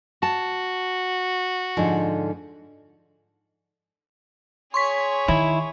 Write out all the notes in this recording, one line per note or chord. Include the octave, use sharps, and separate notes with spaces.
F#4 A5
G#2 D3 F3
G#4 C#5 C6 C#6 B6
D#3 E4